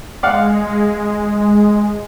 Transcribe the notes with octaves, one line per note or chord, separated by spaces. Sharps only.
G#3 D5 F5 F#5